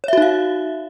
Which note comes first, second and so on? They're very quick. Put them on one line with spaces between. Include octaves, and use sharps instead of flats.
C#5 E5 F#4 D#4 F5